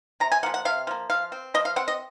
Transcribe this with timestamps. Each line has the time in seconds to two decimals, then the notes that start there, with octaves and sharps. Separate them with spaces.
0.20 C3 A#5
0.32 G#5
0.43 A#3 F#5
0.46 F3
0.54 F#5
0.65 C3 F5
0.87 F3 A#3
1.10 F3 F5
1.32 C4
1.54 F3 D#5
1.65 F5
1.76 C4 F#5
1.88 D#5